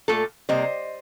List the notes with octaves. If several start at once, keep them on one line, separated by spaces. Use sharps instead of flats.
A#2 A3 F4 A4
C3 G3 A#3 C5 D#5